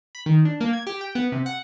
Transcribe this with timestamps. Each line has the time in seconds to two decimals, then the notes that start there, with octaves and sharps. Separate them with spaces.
0.15 B5
0.26 D#3
0.45 D4
0.61 A#3
0.73 G#6
0.87 G4
1.01 G5
1.15 B3
1.32 C3
1.46 F#5